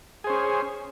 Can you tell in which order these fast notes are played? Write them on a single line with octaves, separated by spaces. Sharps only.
G#4 C5 C#4